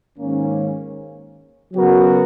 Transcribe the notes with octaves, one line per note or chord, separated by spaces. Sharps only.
G#2 D#3 A#3 C#4
C#3 F#3 B3 F#4 A#4